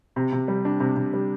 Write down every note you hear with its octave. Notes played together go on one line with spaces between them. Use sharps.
C3
C3
G3
D4
C3
C3
G3